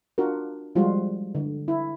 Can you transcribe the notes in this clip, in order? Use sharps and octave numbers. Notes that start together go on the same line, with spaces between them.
D4 F4 F#4 A#4
F3 G3 G#3 F4 F#4
D3
E4